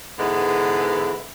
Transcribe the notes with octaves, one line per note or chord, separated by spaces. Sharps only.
G#2 D3 E3 G#3 B3